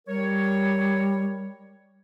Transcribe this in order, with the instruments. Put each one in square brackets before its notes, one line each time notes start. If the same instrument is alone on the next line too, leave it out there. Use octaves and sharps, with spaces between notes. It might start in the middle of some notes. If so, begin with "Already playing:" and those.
[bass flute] G3 [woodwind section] A#4 C#5